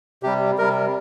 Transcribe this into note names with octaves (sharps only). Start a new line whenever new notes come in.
C3 G3 G4
C3 G3 A#4